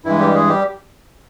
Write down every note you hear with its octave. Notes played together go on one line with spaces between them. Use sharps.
G2 E3 G#3 E4
G3 G4
G#3 G#4
G3 G4